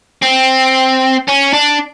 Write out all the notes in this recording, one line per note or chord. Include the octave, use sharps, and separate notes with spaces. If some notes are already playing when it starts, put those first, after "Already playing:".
C4
C#4
D4